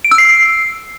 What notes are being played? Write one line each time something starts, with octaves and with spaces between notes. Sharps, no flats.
D7
E6
C7